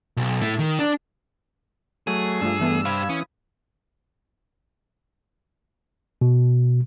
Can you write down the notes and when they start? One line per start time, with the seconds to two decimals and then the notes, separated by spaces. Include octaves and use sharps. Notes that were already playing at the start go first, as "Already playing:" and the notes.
0.17 B1
0.41 A2 A3
0.59 D#3
0.79 D4
2.07 F#3 A3 G#4
2.41 G2 F3 A3 D4 E6
2.60 E3 A3 B3
2.85 G4 C5 F5 B5 G#6
3.09 E3 C#4 D#6
6.22 B2